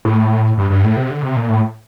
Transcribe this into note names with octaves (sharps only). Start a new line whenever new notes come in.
A2
G2
G2
A2
C3
D3
C3
A#2
A2